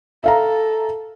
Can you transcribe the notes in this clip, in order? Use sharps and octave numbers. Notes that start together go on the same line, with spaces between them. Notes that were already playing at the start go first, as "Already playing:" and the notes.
A4 E5 F5 A#5